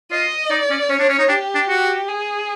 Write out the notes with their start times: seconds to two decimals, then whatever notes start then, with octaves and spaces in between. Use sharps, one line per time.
0.11 F4 D#5
0.51 D#4 D5
0.70 C#4
0.89 C#4 C#5
0.99 D4
1.09 C#4
1.19 D#4
1.29 D4 G4
1.55 D4
1.68 F#4
2.08 G#4